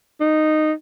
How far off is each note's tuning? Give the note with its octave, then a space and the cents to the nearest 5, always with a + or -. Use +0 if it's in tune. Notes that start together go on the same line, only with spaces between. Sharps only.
D#4 -10